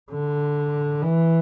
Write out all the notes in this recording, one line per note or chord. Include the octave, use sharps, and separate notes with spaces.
D3
E3